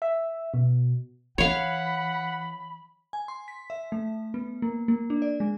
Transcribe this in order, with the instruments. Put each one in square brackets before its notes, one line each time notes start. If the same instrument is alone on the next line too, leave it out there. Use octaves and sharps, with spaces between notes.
[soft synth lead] E5
B2
[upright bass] E3 [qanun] C#5 F5 [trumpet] F#5 [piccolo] B5
[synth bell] G#5
C6
B6
E5
A3
B3
A#3
A#3
D4
D5
G#3